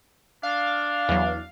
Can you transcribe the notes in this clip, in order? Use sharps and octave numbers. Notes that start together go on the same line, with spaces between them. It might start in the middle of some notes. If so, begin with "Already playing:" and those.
D4 F5
E2 F#3